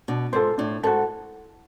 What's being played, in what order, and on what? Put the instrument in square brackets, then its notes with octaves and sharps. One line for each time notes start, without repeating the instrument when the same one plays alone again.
[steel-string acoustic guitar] B2 [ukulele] D4
[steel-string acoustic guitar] G#2 [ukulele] F4 A4 C5
[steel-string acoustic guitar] A2 [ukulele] D4
[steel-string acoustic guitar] G#2 [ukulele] F#4 A4